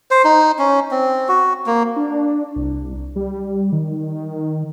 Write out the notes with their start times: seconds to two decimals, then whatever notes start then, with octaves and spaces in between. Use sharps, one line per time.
0.11 C5
0.24 D#4
0.59 C#4
0.91 C4
1.29 F#4
1.66 A#3
1.96 D4
2.56 C2
3.16 G3
3.72 D#3